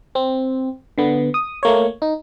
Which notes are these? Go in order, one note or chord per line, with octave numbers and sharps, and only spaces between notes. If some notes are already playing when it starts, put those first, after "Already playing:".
C4
D3 B3
D#6
A3 A#3 C#5
D#4